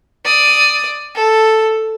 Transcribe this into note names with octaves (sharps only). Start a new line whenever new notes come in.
D5 D#6
A4